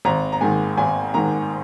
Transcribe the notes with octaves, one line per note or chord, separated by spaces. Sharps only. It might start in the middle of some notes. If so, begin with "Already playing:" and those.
G#1 A#5
A#5
G#2 D#3 G#5
G#1 G#5
G#2 D#3 A#5